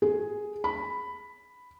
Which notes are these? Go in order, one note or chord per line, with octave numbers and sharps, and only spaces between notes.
G#4
B5